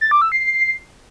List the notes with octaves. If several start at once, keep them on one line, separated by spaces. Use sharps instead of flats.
A6
D6
E6
C7